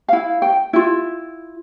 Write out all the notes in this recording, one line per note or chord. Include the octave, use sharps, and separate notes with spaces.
E4 F5
G5
E4 F4